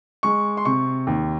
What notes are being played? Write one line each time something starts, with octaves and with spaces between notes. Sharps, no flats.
G#3 C#6
C6
C3 C#6
D#2